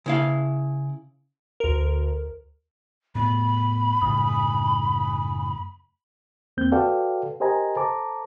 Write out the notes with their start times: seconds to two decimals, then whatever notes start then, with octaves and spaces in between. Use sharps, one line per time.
0.06 C#3 E4 F5
1.60 D2 A#4
3.15 A2 B3 B5
4.02 F#2 A2 C#3 G#5 D#6
6.57 E2 A#3 C4 G6
6.72 F#4 A4 B4 D5 F5 G5
7.40 G4 A#4 C5 D#5 G#5 A#5
7.76 A4 C5 A5 A#5 D6